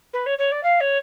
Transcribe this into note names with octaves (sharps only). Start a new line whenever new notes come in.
B4
C#5
C#5
D5
F5
C#5